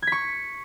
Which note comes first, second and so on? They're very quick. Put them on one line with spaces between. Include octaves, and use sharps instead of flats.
G#6 B6 C#6